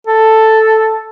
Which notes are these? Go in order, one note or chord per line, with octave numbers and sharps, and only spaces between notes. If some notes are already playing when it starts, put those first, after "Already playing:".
A4